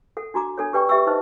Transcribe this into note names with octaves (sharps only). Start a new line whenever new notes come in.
A4 F#5
D4 F#4 A#5 D6
D4 A4 C#5
G4 B4 D5 G5 C#6
G4 B4 E5 G5 C#6 E6
D#4 B4 C5 D#5